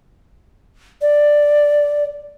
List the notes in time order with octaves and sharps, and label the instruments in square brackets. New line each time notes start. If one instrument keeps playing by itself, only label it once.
[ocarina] D5